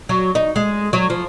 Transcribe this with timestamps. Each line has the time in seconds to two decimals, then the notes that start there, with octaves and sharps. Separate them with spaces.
0.09 F#3
0.35 D#4
0.56 G#3
0.93 F#3
1.10 F3